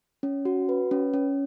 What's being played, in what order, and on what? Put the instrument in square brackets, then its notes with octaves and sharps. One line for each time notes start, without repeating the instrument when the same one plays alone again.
[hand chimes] C#4
F#4
B4
C#4
C#4